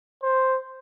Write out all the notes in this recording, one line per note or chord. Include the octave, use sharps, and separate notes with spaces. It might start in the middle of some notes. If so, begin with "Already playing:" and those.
C5